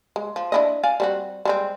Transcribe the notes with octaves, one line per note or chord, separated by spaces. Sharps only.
G#3
F3
D4 E4 D#5
D5 F5 G#5
G3 C4 F#4
G3 G#3 C4